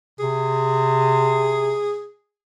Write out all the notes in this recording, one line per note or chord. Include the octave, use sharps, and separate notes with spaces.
C3 G#4